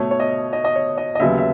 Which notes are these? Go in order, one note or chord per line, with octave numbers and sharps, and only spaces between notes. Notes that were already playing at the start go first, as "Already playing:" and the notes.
Already playing: B2 A3 C#5
C#5
D#5
D#5
D#5
C#5
D#5
D#5
D#2 C#3 F#3 B3 E5
E5